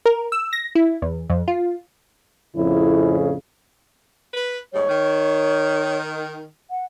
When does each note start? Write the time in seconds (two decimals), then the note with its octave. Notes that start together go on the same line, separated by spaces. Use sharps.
0.06 A#4
0.32 E6
0.53 A#6
0.75 E4
1.02 E2
1.30 F2
1.48 F4
2.56 F2 A2 C#3 E4
4.34 B4
4.73 D#2 G#2 G3 C#5
4.89 D#3
6.70 F#5